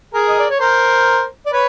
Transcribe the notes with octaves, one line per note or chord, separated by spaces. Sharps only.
G#4 A#4
D#5
D5
C#5
A#4 C5
D5
B4 C#5